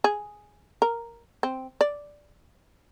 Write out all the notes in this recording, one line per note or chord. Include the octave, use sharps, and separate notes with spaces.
G#4
A#4
C4
D5